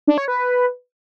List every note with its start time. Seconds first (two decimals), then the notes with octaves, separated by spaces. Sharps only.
0.07 D4
0.18 C#5
0.28 B4